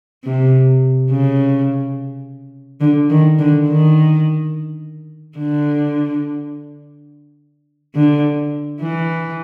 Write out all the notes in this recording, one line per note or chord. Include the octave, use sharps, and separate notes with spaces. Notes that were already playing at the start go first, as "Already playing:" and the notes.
C3
C#3
D3
D#3
D3
D#3
D3
D3
E3